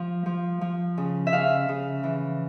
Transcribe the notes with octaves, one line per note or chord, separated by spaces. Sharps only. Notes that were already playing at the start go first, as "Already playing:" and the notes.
Already playing: F3
F3
F3
C#3
E5
C#3 F5
C#3
E3